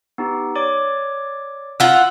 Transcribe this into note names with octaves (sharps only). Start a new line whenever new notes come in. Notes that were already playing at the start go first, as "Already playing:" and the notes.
B3 D#4 G4
C#5 D5 D6
F4 F#5 E6